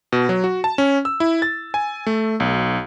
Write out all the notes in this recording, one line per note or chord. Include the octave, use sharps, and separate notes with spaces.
B2
F#3
F#4
A5
C#4
E6
E4
A6
G#5
A3
B1